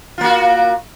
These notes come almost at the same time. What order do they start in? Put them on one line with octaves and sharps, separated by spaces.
F4 A#3 F#4